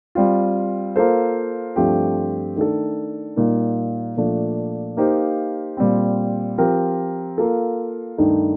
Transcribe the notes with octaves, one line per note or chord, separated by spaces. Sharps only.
G3 C4 F4
A#3 F4 A4 C5
G2 F3 A3 C4 G4
D#3 A3 D4 A4
A#2 G3 A#3 D#4
A#2 F3 A3 D4
A#3 D#4 G4 C5 F5
A#2 G3 C4
F3 C4 G4 A#4
A#3 F4 A4
G2 D#3 A3 D#4